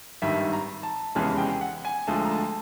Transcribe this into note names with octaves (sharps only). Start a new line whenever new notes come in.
G#1 G2 D#3 E5
A#5
A5
F1 E2 C#3 E3 G#3 A5
G5
F#5
G#5
D2 D3 F3 G#3 A5
A#5
A5